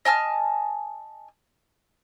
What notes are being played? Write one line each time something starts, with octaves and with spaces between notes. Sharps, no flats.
D#5 G#5 A5 F6